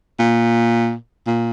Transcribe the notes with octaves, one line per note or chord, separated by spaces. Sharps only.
A#2
A#2